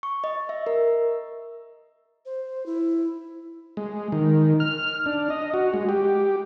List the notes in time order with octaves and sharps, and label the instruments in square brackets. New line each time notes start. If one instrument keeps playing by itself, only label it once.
[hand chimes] C#6
D#5
E5
A#4
[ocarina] C5
E4
[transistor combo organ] G#3
D#3
F6
D4
D#5
F#4
G#3
G4